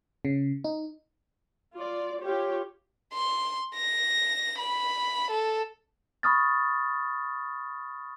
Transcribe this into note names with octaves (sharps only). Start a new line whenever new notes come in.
C#3
D#4
F4 D5
F4 G4 C#5
C6
A#6
B5
A4
B5 C#6 D#6 F6 A6